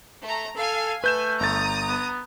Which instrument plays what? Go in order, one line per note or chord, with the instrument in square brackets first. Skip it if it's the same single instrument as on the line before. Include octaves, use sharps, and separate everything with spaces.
[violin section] A3 A#5
[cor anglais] A4 [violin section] F5 G#5
[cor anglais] A3 [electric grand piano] B4 G6 E7 [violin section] G#5
[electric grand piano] G1 A6 [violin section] A#5 D#6
[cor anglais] B3